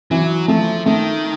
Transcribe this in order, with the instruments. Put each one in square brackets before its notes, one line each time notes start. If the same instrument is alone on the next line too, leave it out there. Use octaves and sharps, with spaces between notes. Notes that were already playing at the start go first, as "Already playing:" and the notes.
[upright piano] E3 [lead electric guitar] F#3
[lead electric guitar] F3 [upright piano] A3
[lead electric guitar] D#3 [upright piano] A3